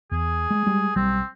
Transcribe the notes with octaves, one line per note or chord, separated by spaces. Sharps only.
E2 G#4
G#3
G3 G#3
B1 G3 C4